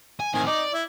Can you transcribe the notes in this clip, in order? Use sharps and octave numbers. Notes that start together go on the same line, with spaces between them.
G#5
A2 D#3 C4 G#5
D#4 D5
E4